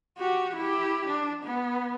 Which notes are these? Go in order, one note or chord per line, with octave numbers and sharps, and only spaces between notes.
F#4 G4
E4 G4
D4
B3